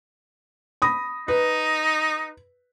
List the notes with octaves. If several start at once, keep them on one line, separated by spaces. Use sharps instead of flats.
B5 D#6 A#6
D#4 B4